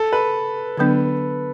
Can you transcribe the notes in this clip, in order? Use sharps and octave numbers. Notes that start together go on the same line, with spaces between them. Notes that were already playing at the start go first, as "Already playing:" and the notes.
Already playing: A4
B4
D3 F#3 B3 D4